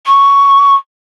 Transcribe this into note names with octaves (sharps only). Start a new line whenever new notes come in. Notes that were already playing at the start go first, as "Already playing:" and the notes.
C#6